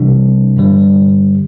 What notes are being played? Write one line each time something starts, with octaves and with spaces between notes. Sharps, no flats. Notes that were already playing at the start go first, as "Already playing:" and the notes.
Already playing: C3 E3 G3 D4
G2 D3 G3